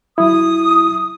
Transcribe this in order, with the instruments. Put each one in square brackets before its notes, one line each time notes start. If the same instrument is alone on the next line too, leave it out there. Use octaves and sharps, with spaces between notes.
[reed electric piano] F#3 E4 [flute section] D#6